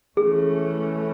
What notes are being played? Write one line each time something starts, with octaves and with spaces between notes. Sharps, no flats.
E3 A3 C#4 G#4